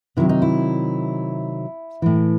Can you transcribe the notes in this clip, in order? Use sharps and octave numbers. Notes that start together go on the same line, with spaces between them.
C3 D#3 F#3 E4
D#4
E4
A2 E3